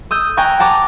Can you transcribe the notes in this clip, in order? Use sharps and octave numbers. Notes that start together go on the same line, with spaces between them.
D#6 E6 G6
G5 G#5 A#5 C#6 F#6
F#5 A5 A#5 D6